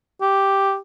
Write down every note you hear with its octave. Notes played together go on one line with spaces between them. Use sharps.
G4